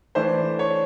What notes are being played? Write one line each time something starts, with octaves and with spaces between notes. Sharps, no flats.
E3 A3 D4 C5
C#5